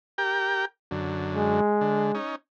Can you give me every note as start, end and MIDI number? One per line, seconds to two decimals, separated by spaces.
0.18 0.65 67
0.18 0.65 70
0.18 0.65 79
0.91 1.60 42
0.91 1.60 50
1.36 2.17 56
1.81 2.12 50
2.15 2.36 61
2.15 2.36 63